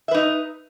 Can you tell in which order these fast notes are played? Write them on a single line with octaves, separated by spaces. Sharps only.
E5 B4 D#4